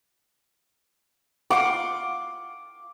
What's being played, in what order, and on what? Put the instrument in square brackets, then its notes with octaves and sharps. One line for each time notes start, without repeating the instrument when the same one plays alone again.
[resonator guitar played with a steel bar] F4 F5 F#5 [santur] D6